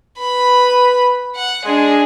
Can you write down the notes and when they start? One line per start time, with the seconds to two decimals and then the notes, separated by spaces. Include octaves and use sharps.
0.18 B4 B5
1.36 F#5
1.65 G#3 D4 G#4